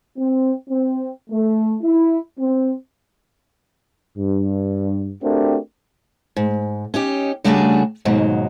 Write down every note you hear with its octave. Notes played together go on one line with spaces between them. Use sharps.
C4
C4
A3
E4
C4
G2
A3 C4 D4 F#4 G4 A#4
G#2
C#4 D#4 G4
C#3 G3 A3 D4 F#4 G#4
D#2 G#2 B2 F#3